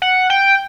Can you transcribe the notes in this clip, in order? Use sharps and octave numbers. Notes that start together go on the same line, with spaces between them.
F#5
G5